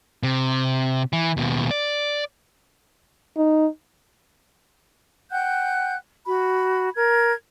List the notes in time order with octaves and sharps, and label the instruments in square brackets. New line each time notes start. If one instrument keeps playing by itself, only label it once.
[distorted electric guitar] C3
E3
D#2 B2
D5
[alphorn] D#4
[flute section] F#5 G5 F#6 G6
F#4 B5
A#4 G#6